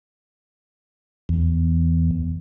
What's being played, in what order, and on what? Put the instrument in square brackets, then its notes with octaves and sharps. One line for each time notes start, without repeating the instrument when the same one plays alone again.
[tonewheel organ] E2